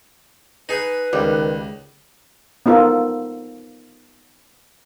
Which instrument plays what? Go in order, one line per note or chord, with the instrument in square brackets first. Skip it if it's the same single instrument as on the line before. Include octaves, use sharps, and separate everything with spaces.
[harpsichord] D#4 G#4 [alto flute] B4
[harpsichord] C#2 [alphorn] D#3 [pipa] G3
[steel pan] B3 D#4 F4 A4 A#4